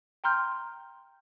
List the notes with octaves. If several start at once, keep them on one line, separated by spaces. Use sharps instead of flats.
G5 A#5 C6 F6 G6